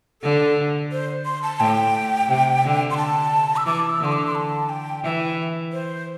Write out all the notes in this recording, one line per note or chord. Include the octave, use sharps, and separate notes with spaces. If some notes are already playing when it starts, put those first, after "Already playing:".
D3 A4
C5
C6
A5
A2 G5
C3
D3
C6
A5
E6
E3 D6
E6
D3 C6
D6
C6
A5
G5
E3 E5
C5